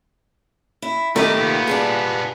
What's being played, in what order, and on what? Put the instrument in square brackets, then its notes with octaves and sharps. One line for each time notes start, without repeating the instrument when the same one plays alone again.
[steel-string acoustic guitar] E4
[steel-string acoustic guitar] D#3 G4 [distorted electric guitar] G3 D#5 [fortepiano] A3
[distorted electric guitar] A#2 B3
[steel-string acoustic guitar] G3 D4 G#4